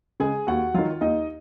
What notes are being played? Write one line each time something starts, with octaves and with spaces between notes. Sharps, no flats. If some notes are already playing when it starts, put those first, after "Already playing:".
C#3 G#3 G#4 G#5
D#2 F#4 F#5
D#3 F#3 F4 F5
D#2 D#4 D#5